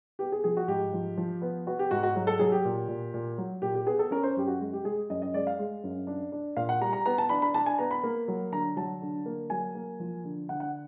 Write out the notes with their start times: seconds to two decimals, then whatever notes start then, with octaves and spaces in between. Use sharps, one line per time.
0.19 B3 G4
0.32 G#4
0.44 F3 G#4
0.57 F#4
0.68 G#2 G4
0.94 F3
1.17 F3
1.42 B3
1.67 B3 F#4
1.79 G4
1.91 G#2 F#4
2.03 F#4
2.16 F#3
2.27 A4
2.39 F#3 G#4
2.52 G4
2.65 A#2
2.88 A#2
3.14 A#2
3.38 F#3
3.62 A#2 G4
3.75 G4
3.86 B3 G#4
3.99 A4
4.11 C#4 A#4
4.23 C5
4.36 F#2 G4
4.48 F#4
4.60 G#3
4.73 G4
4.85 G#3 G#4
5.10 F#2 D#5
5.22 D#5
5.34 G#3 D5
5.47 F5
5.59 G#3
5.84 F#2
6.07 D4
6.32 D4
6.56 A#2 F5
6.69 F#5
6.81 G3 A#5
6.93 A#5
7.06 B3 A#5
7.18 A5
7.29 D4 B5
7.42 B5
7.54 D4 A5
7.66 G#5
7.79 B3 A#5
7.91 B5
8.03 A#3
8.28 F#3
8.52 D3 A#5
8.76 F#3 A5
9.02 D3
9.26 A#3
9.50 F#3 G#5
9.75 A#3
10.00 F3
10.24 D3
10.49 D3 F#5
10.60 F#5